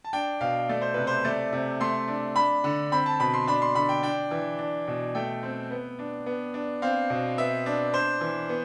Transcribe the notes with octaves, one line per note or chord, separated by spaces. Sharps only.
A5
D4 G5
B2 F5
A3 D5
C5
C3 B4
C5
A3 D5
C3
A3 C6
D4
D4 B5
D3
C4 B5
A5
B2 B5
C6
D4 B5
C6
D3 B5
G5
D4 G5
E3
D4
B2
A3 G5
C4
B3
D4
B3
D4
C4 F5
B2
B3 E5
D4
D4 C5
E3
B3